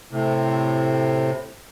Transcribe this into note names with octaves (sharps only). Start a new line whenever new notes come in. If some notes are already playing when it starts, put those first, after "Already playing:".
A2 C3